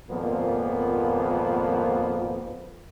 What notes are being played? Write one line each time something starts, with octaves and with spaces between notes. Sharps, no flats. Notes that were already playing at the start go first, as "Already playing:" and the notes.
G#1 F2 A#2 F3 A#3 B3